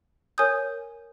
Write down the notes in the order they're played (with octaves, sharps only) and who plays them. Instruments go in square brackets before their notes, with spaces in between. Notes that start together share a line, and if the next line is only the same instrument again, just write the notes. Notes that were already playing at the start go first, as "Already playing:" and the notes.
[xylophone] A#4 C#5 G#5 D#6 G6